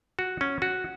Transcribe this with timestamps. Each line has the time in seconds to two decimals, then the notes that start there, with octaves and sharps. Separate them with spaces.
0.19 F#4
0.41 C#4
0.62 F#4